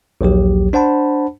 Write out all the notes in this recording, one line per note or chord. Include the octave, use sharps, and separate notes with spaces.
A#1 D#2 F#3 G4
D4 C5 F#5 A5 B5